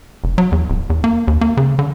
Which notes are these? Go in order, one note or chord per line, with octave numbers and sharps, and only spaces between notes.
F1
F#3
E2
D1
E2
A#3
D#2
A#3
C#3
D3